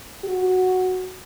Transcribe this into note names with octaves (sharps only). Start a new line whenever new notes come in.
F#4